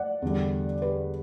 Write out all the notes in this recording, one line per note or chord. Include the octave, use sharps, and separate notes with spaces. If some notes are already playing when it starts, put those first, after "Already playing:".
Already playing: D5 F#5
E2 D3 G3
G4 B4